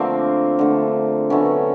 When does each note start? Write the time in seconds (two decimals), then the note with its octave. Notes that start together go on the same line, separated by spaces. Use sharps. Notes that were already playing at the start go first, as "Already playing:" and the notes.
Already playing: D3 F3 A3 A#3 C4
0.59 D3 F3 A3
1.30 D3 F#3 A3 B3 C#4